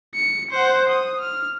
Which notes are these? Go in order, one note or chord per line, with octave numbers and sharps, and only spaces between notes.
C#7
C5 F#5
D#6
F6